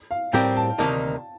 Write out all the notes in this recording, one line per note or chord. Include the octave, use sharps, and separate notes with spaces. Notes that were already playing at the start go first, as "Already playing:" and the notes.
F5
A2 G3 C4 G4 A#4 G5
A5
D2 C3 D#3 A#3 D#4 A5